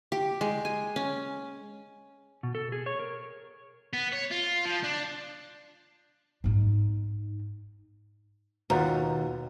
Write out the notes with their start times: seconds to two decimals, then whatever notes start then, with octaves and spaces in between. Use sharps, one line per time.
0.12 G4
0.41 G#3
0.65 G#5
0.96 C#4
2.43 B2
2.55 A4
2.72 G#4
2.86 C#5
2.99 A#4
3.93 B3
4.12 C#5
4.31 F4
4.66 F3
4.84 D4
6.44 G#2 D#4
8.70 D#2 B2 F4 F#5 A#5